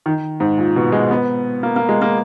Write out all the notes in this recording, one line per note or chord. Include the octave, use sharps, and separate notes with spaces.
D#3
G#2
A#2
B2
G#3
B3
A#3
A#3
G#3
A#3